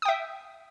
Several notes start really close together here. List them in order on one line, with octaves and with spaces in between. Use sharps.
D#6 G5 E5